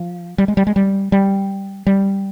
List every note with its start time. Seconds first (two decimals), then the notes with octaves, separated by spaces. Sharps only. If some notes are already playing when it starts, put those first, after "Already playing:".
Already playing: F3
0.38 G3
0.48 G#3
0.57 G3
0.67 G#3
0.76 G3
1.12 G3
1.87 G3